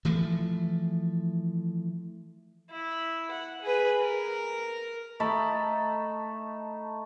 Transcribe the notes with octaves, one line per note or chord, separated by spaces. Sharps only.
E3 F3 A3
E4
F#5
G#4 B4
A#4
A3 D#4 A5 B5